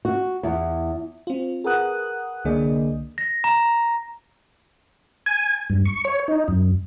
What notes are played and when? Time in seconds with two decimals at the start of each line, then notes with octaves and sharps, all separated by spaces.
0.05 F#4
0.43 E2
1.27 C4 F4
1.64 G#4 A#4 B4 F#5 D#6 F#6
2.45 C2 D3 A#3 G#4 D5 D#5
3.18 A#6
3.44 A#5
5.26 G#5
5.70 G2
5.85 C#6
6.05 C#5
6.28 D#4
6.48 F#2